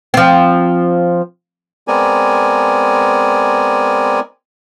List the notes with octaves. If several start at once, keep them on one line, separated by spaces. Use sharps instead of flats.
F3 C4
G#3 B3 C4 A#4 D5 G#5